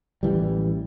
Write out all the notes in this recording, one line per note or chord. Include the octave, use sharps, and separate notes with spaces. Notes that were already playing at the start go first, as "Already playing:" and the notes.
A1 E3 G3